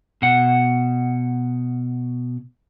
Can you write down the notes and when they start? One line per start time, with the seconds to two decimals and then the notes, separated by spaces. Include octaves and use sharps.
0.22 B2 F#5